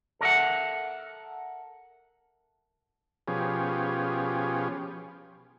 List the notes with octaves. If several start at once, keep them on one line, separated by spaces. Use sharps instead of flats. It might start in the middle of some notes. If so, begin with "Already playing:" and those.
A4 A#4 D5 E5 F#5
B2 F3 C#4 G4 G#4